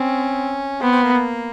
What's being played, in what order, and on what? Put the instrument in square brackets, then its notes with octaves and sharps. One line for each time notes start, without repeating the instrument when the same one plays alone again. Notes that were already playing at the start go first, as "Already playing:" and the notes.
Already playing: [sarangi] C4 [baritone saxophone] C#4
[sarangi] B3 [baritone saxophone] C4
[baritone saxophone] C4
A#3
A#3